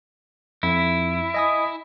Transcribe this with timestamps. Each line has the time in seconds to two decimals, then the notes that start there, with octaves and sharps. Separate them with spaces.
0.63 F2 E4
1.34 D#5 G#5 D#6